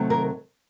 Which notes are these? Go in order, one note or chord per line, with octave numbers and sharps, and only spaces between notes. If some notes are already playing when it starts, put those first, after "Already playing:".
Already playing: C3 D#3 F#3 A3
A#4